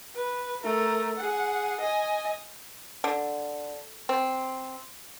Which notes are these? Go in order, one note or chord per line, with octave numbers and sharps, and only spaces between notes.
B4
A3 A#4
G#4 F#5
D#5 G#5
D3
C4